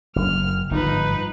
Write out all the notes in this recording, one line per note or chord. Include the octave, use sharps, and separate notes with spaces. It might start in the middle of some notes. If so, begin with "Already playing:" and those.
F#1 F6
G1 G#2 F3 D#4 B4